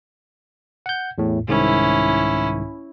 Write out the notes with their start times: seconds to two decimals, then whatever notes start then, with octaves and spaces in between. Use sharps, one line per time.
0.86 F#5 G6
1.18 E2 A2
1.48 C2 G#2 D#3 C#4 E4